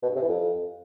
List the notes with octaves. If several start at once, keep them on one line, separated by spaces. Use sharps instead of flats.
B2
G2
C3
E3
F2